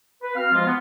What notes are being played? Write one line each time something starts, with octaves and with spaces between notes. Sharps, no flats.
B4
C4 F#4 F5 F6
F3 G#3 F4
B3